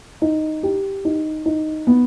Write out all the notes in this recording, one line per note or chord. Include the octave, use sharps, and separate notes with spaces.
D#4
G4
D#4
D#4
B3